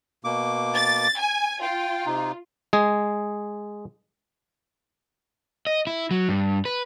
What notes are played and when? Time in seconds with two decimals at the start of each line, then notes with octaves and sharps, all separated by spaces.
0.24 B2 A#3 D6
0.75 A6
1.18 G#5
1.62 F4 G5
2.06 C3 D#4
2.73 G#3 G#4
5.67 D#5
5.87 E4
6.11 F#3
6.29 G2
6.65 B4